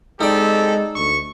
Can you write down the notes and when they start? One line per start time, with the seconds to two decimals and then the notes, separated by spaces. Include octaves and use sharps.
0.21 G#3 C4 D#4 G4 A4 D5
0.96 D2 C#6